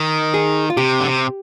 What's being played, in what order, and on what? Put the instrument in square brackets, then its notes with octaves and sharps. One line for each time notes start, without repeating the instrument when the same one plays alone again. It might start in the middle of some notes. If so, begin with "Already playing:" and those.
Already playing: [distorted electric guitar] D#3
[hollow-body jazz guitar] G#4
F4
[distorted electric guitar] C3 [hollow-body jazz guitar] G4
[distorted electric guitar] D3
C3